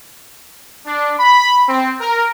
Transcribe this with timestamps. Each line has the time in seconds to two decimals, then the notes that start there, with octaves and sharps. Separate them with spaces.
0.87 D4
1.20 B5
1.69 C4
2.01 A#4